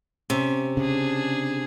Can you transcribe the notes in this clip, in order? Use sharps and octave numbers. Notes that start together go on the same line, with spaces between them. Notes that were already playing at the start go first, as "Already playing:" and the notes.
C3 C#4
C#3 D4 G#4